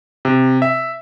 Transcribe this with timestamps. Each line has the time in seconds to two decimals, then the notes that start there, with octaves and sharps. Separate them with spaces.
0.25 C3
0.62 E5